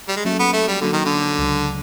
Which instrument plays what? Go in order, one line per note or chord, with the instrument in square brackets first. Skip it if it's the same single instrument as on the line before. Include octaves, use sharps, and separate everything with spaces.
[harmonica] G3
G#3
[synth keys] F#3 A#3 C#4 F#4 A4 [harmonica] A3
[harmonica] B3
A3
G3
[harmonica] D3 [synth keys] F#3 A#3 C#4 F#4 A4
[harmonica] D#3
D3
[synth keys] C#2 C#3 F#3